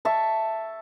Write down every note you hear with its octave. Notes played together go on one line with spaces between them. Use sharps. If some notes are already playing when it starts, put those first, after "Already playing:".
E5 A5 C#6